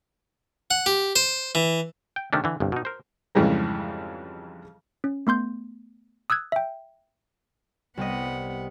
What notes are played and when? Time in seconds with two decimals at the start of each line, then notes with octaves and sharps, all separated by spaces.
0.71 F#5
0.86 G4
1.16 C5
1.55 E3
2.16 G5
2.33 C3 D#3 A3 C#4 D4
2.44 D3 E3
2.60 G1 C2 G2
2.72 B2 D#4
2.85 A#4 C5
3.35 F2 G#2 C#3 E3 G3 G#3
5.04 C#4
5.27 A3 B3 C6 G6
6.30 D#6 E6 F#6 G#6
6.52 E5 G5
7.97 C2 B3 G4 D#5 F#5